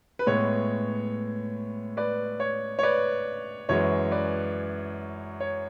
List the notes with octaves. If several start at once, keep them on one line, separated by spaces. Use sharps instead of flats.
B4
A2 G#3 B3 C#5
B4 D5
C#5
C#5
B4 D5
F#2 E3 G#3 C#5
B4 D5
C#5